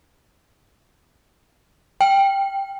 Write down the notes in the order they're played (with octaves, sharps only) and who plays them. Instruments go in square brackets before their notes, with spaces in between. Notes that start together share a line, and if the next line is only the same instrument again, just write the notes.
[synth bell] G5